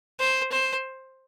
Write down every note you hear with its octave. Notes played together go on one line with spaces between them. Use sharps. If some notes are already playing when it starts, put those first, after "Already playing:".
C5
C5